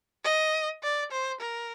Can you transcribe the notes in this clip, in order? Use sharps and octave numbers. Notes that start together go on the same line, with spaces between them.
D#5
D5
C5
A#4